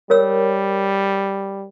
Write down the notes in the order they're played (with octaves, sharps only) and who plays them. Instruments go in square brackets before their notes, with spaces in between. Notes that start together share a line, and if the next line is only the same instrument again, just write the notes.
[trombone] G3 [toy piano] A#4 C#5 E6